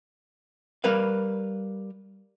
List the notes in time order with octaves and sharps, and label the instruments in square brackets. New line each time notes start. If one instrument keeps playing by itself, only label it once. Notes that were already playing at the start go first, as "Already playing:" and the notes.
[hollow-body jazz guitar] G3 A#4 B4 F5